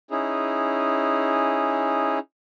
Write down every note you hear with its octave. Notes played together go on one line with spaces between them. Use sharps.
C#4 D#4 E4 G#4